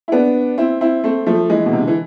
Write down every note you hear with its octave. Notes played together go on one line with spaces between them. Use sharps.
E4
B3 D4
C4 E4
C4 E4
A3 C4
F3 A3
E3 G#3
B2
C3
D3
E3